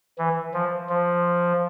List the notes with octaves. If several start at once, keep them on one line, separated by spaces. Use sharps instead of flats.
E3
F3
F3